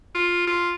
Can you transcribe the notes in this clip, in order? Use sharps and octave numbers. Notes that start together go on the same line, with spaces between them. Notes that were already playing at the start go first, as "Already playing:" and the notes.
F4
F4